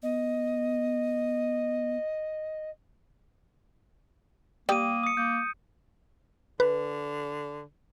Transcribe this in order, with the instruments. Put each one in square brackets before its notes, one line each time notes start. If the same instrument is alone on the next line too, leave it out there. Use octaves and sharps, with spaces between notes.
[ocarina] B3 [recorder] D#5
[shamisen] G3 G4 [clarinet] A#3 [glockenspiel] D#6 D#7
[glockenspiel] D#6 C#7
[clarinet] A#3 [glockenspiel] G6
[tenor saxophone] D3 [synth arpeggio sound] B4